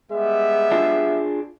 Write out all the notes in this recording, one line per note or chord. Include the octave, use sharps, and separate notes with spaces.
G3 G#3 B3 E5
D4 F4 G#4